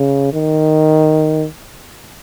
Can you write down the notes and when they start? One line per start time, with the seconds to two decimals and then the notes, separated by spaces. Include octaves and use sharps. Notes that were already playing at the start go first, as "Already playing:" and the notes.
Already playing: C#3
0.33 D#3